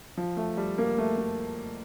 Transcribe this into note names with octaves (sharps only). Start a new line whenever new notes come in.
F3
A3
G3
A#3
A3
A3